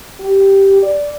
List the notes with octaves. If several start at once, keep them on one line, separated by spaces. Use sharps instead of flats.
G4
D5